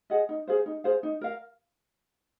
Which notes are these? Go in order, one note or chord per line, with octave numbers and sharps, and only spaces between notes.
G#4 D#5 F#5
D#4
G#4 C5 F5
D#4
G#4 C5 F5
D#4
A#4 F5